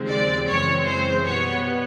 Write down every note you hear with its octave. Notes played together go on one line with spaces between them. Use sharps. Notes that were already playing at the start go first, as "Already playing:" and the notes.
Already playing: D#2 C#3 F3 G#3 C4
D5
F#2 C#3 E3 G#3 C4 C#5
C5
B2 G3 B3 C#5